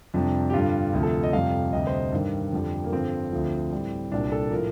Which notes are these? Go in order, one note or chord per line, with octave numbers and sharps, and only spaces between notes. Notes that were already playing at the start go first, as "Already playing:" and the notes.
F2 C3 G3 D4
G4
G2 D3 G3 F4
D2 C3 F3
A4
D#5
F2 C3 G3 F5
D2 C3 G3 D#5
C5
G2 D#3 G3
F2 D3 G3
A#3
G2 D3 F3 C4
D2 D3 F3
A2 G3
C2 A#2 G3 D4
A4
A2 F3 A#4